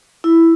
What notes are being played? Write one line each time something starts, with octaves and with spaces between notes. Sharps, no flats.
E4